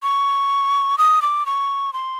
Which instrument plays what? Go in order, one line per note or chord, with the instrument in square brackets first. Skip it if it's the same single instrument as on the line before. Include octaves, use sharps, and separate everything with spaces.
[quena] C#6
D#6
D6
C#6
C6